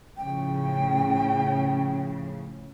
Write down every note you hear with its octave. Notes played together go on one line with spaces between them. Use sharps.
A2 C#3 F3 G5